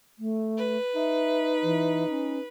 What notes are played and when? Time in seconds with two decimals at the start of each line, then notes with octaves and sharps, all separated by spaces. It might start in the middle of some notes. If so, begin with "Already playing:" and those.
0.19 A3
0.57 B4
0.95 D#4 E5
1.63 E3
2.10 C#4